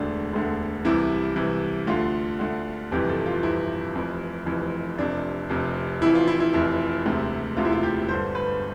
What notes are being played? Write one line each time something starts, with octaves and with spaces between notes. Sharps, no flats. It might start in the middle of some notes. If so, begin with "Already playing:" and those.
Already playing: E1 D2 D3 D4
E1 D2 D3
C2 C3 E3 E4
C2 C3 E3
D2 D3 F4
D2 D3
G1 F2 C3 E3 G4
A4
F4
G1 F2 C3 E3 E4
F1 F2 E3
F1 F2 E3
F1 F2 C3 D4
F1 F2 C3
F1 F2 E3 E4
F4
E4
E4
F1 F2 E3 E4
E1 D2 C3
E1 D2 C3 F4
E4
F4
G4
G1 G2 D3 C5
B4